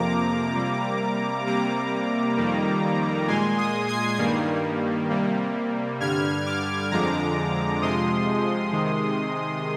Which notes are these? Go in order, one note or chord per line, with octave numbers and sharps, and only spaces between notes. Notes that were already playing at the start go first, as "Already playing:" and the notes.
Already playing: F2 C3 F3 A#3 A#5 D6
C3 G3 A#3
C3 G3 A#3 A#5 D6
F2 D#3 G3 A#3
A#2 G#3 G#5 C6
C6 D#6
G#6 C7
G2 D#3 G3 A#3
C3 G3 A#3
G2 D3 G3 F6 G#6
D6 F6
F2 D3 F3 G#3 A#5 D6
F2 C3 F3 G#3 C6 D#6
C3 D#3 G#3